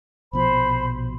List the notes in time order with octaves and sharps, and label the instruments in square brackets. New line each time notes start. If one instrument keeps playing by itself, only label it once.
[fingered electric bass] A#1 B2 F3 [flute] C5 [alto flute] B5